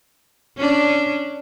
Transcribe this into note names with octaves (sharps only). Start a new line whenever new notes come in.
C#4 D4